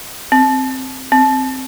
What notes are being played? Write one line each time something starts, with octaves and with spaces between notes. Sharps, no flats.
C4
C4